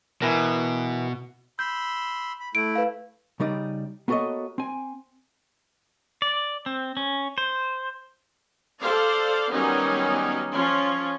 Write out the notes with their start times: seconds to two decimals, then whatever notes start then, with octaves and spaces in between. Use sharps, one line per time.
0.22 B2 E3 A#4
1.59 B5 C6 E6 G6
2.40 B5
2.55 A3 E4 D7
2.75 B4 F5
3.40 C#3 G3 D#4 D5
4.08 A#3 B3 F#4 A4 C#5 D#5
4.58 C4 G#5
6.22 D5
6.66 C4
6.97 C#4
7.38 C5
8.80 A4 C5 D5 F5
9.50 D#3 F#3 G3 B3 C#4 D#4
10.51 F3 C#4 F4